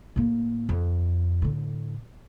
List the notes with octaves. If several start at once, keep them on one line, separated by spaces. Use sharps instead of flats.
A2 A#3
F2
A2 D3